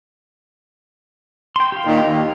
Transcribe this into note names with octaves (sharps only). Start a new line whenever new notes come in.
G5 C6
G4 F5
A#2 D#3
D#2